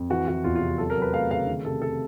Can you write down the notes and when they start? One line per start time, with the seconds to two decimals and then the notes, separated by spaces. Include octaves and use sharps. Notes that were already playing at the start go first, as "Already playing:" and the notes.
Already playing: F2
0.10 E3 F#4
0.28 E3 F#4
0.44 E2 F4
0.56 F4
0.61 C3
0.78 F#3 A4
0.90 A#4
0.97 F#3
1.02 B4
1.13 A3 F5
1.31 C#3 F5
1.47 D#3
1.65 C3 A4
1.82 A4